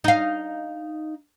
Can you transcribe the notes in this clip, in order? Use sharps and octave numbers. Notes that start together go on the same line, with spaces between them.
D#4 F5